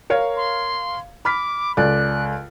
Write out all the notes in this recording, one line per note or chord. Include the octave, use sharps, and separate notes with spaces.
A#4 C#5 F5
C6
B5 D6 F6 B6
C#2 A4 D5 F#6